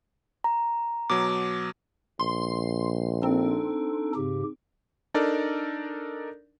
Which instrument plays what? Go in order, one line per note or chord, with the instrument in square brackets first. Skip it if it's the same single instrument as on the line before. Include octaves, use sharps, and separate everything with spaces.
[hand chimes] A#5
[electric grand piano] B2 F#3 [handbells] D6
[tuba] A#1 [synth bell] C6
[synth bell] C4 [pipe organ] D4 D#4 A4
[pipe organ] G#2 C#3 G4
[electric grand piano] D4 D#4 A4 A#4 D5